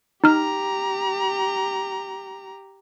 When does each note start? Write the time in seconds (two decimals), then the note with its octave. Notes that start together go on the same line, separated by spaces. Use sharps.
0.24 D#4 G4 A#5 F6